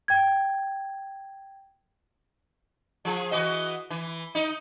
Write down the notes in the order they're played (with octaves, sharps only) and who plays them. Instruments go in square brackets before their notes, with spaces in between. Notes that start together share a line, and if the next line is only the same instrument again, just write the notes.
[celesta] G5 G#6
[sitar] F3 G#4
E3 F#4 D#5
E3
D#4 D#5